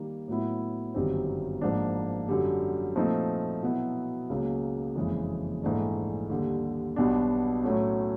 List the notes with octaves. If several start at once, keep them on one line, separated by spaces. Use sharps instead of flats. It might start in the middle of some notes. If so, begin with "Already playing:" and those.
Already playing: D#3 G3 A#3
A2 F#3 B3 E4
G1 F#2 D#3 G3 C4
G#2 F3 A#3 D4
F#2 D3 G3
A#2 F3 A3 C4 D#4
B2 F#3 B3 E4
C#2 C#3 F#3 A#3
F#1 F2 C#3 E3 G#3
A#1 G#2 E3 A3 D4
D#2 D3 G3
B1 B2 G3 B3 D4
A2 F#3 A3 C#4